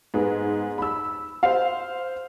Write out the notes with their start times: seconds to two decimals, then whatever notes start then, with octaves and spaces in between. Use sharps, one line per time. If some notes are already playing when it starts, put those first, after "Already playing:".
0.14 G#2 B3 G#4
0.78 B5 E6
1.43 C5 F5